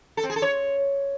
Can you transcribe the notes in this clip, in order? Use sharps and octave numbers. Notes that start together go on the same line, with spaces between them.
A4
C4
G#4
A4
C#5